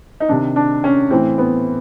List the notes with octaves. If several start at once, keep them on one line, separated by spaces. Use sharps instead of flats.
D#4
C3 D#3 D4
D4
C#4
A2 E3 C4
B3